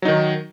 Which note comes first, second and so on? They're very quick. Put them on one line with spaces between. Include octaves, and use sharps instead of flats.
F#3 D#4 D#3